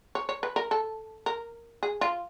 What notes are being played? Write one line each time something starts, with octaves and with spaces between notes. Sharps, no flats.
C#5
C#5
B4
A#4
A4
A#4
G#4
F4